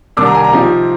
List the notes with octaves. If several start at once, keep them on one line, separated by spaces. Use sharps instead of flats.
C2 C3 D#3 G3 D4 D6
A#5
G#5
A#5
C3 F3 C4 D#4